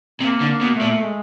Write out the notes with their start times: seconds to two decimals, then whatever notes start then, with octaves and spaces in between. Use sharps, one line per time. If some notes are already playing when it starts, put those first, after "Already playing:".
0.20 C3 A#3
0.41 D3
0.47 A#3
0.61 B2
0.74 A3
0.81 A#2
1.01 G#3